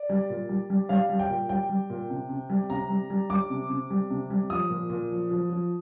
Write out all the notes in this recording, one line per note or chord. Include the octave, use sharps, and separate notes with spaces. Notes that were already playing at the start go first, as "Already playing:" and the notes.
Already playing: D5
G3
A#2
G3
G3
G3 F5
G3
G5
A#2
G3 G5
G3
A#2
C3
C3
G3
C3 A#5
G3
G3
G3 D6
C3
C3
G3
C3
G3
F3 D#6
A#2
A#2
F3
F3
F3